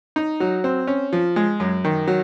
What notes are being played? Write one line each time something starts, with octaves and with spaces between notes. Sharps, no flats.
D#4
F#3
C4
C#4
F3
G#3
F#2
D#3
F#3